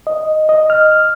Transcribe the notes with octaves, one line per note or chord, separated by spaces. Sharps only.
D#5
D#5
F6